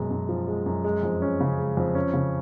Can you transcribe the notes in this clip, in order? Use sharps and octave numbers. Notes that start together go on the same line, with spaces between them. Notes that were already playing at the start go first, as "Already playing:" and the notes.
Already playing: F#2 B2 G#3
F#2
F3
G#3
F#2
G#3
F2
C#4
C#3
G#3
F2
C#4
C#3